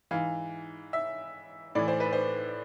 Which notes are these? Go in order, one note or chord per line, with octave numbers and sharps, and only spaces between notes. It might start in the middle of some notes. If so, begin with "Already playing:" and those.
G#2 E3 F5
E5
A2 E3 D5
C5
B4
C5